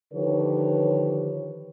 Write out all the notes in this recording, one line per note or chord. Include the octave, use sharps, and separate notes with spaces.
D3 D#3 F3 G4 B4 C#5